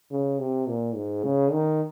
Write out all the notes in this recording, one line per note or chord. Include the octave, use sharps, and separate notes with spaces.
C#3
C3
A#2
G#2
C#3
D#3